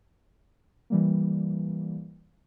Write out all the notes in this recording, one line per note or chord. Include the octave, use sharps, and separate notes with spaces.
E3 G3 A#3